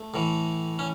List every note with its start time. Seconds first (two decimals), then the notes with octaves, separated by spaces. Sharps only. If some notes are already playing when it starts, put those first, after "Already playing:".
Already playing: A3
0.14 A2 E3
0.79 C#4